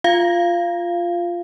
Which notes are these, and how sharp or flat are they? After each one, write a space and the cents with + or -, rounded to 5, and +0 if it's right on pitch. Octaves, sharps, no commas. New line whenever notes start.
F4 +0 F5 -15